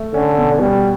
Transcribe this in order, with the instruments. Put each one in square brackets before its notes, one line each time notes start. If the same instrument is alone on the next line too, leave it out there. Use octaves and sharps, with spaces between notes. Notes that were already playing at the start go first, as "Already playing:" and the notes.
Already playing: [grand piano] A3
[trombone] D3 [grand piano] C#4
[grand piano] B2
[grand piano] B2 [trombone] G3